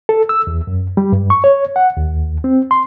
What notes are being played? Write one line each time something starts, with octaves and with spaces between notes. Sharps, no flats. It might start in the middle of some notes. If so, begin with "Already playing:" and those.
A4
E6
E2
F#2
G3
G2
C#6
C#5
F#5
D#2
C4
C6